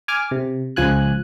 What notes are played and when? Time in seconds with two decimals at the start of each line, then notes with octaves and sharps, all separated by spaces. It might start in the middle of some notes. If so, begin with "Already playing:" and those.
0.08 G#5 D6 F6
0.31 C3
0.76 C#2 F3 G#5 F#6